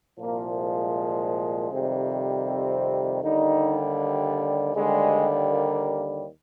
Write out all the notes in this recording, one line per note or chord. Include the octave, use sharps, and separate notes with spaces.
C2 A#2 F3 A#3
G#3
F2 C3 D#3 G3
C4
D#2 D3 G3 D#4
D#2 D3 G3 G#3
A#3